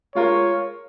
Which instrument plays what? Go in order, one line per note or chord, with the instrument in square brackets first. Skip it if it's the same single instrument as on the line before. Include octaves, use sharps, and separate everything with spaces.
[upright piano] G#3 F4 A#4 [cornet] C#5